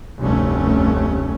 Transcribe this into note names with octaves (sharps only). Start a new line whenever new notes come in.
F1 D2 G2 A3 C#4